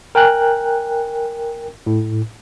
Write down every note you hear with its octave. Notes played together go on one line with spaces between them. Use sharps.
A#4 G5 G#5 F#6
A2